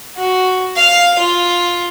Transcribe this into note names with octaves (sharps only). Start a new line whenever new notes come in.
F#4
F5
F4